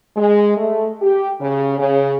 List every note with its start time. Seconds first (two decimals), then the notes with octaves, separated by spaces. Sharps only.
0.17 G#3
0.57 A3
1.02 G4
1.39 C#3
1.78 C#3